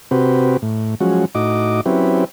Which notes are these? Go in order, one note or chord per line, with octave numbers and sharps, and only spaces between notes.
C3 C4 F#4 G4 B4
A2
F3 F#3 G#3 C#4 F#4
A2 D#4 F#4 D#5 D6
F#3 C4 C#4 E4 G4 B4